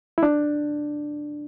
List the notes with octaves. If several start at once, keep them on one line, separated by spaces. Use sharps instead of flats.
E4
D4